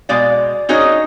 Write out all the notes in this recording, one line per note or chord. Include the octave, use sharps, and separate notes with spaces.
B2 G#3 D5 F5
C#4 D#4 F#4 G#4 C#5 D#5